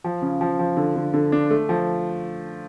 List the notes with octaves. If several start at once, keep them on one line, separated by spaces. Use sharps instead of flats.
F3
C#3
F3
F3
D3
D3
D3
D4
A3
F3